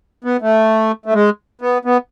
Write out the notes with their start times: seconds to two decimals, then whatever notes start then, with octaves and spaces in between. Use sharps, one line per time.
0.24 B3
0.42 A3
1.06 A3
1.13 G#3
1.61 B3
1.85 B3